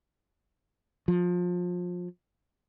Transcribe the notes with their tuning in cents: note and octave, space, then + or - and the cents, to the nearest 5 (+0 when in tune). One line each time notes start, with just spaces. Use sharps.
F3 +25